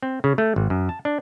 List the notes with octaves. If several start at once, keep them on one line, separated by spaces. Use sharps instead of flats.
C4
C#3
A3
G#1
F#2
A5
D4